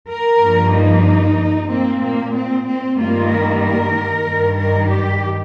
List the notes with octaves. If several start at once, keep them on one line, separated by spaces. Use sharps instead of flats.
A#4
G2 F3 A#3
D#4
A#2 A#3 C4
A#3
C4
C4
G2 D#3 G3 A#3 F4
A#4
A#4
G2 D#3 G3
A#4
G4